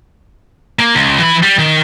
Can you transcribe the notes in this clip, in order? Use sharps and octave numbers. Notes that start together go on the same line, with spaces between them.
A#3
C#2
E3 B5
G3
D#3